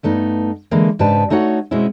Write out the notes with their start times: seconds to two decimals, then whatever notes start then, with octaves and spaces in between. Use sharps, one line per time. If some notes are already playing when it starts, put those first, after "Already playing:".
0.03 G2 A3 B3 D#4
0.71 D3 E3 G#3 A#3
0.99 G#2 C#3 D4 G4 B4 A5
1.30 A3 D#4 F#4 C#5 F#5
1.71 B2 G#3 C4 C#4 E4